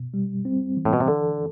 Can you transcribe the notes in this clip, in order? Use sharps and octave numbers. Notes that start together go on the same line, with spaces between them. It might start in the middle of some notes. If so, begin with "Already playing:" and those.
Already playing: B2
G3
C4
E3
A2
B2
C3
D3 A4